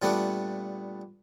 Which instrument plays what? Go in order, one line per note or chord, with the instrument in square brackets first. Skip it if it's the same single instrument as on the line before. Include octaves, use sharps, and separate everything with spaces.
[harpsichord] A#2 G3 A3 B3 D4 D5